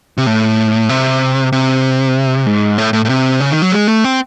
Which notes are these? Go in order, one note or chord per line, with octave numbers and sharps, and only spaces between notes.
C3
A2
C3
C3
G#2
A2
A2
A2
C3
C#3
D#3
F#3
G#3
A3
C4